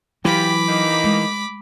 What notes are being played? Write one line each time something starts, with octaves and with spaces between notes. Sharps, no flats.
E3 F#3 F4 G4 B5 D6
D#3 A#3 D#4
G#3